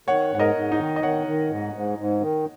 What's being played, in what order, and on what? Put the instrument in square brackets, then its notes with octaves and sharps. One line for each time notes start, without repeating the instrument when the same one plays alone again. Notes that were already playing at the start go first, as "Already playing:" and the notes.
[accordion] D#3 [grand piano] C#5 F#5
[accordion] G#2 [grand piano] F#5
[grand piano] A#4 D#5
[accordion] G#2
[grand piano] D#4
[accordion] D#3
[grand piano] D#5
[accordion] D#3 [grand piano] C#5 F#5
[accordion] D#3
G#2
G#2
G#2
D#3